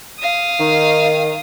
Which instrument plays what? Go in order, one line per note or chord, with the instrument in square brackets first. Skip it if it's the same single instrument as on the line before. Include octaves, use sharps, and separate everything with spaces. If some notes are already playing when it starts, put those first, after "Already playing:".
[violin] F5 D#6
[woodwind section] D#3